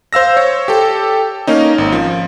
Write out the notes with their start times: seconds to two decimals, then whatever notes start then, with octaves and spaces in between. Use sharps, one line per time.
0.13 C5 F5 E6 A#6
0.37 C#5
0.68 G4 A4
1.47 A#3 C#4 D#4
1.78 G#1
1.92 F3